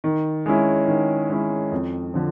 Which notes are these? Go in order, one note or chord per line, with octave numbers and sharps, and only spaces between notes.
D#3
G#3 C#4 E4
D#3
G#3 C#4 E4
F2
D3 F3